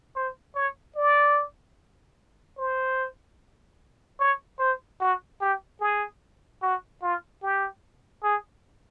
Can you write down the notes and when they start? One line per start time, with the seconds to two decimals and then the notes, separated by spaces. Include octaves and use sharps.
0.16 C5
0.56 C#5
0.96 D5
2.58 C5
4.20 C#5
4.59 C5
5.00 F#4
5.41 G4
5.81 G#4
6.62 F#4
7.03 F4
7.43 G4
8.24 G#4